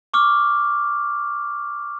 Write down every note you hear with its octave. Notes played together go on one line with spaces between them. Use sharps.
C#6 D6 F6